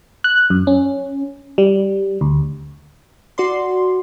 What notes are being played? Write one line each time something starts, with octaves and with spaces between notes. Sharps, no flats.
F#6
F#2
C#4
G3
D2
F#4 D5 C6